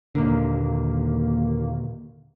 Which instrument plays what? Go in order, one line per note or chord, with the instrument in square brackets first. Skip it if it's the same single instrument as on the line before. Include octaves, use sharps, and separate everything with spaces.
[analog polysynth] D#2 A#3 [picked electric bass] A#2 D3